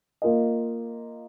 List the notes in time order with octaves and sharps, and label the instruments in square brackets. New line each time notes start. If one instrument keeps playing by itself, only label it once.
[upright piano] A#3 F4 A#4 D#5